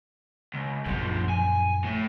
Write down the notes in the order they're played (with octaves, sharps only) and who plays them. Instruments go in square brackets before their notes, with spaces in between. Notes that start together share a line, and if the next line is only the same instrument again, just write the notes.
[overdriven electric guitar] C#2
[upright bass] A#1 F#2 [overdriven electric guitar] B2 F3
[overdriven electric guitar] G#5
A2